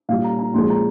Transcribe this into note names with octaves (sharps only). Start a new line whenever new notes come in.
A#2 G3 F5
A#5
A#5
A#2 F3 G#3 C6
A#5